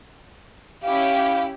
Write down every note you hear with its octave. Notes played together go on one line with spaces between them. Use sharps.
C#4 E4 G4 F5